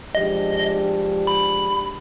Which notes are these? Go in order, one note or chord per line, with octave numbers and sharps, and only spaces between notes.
F3 G#3 D4 G4 D#5
B5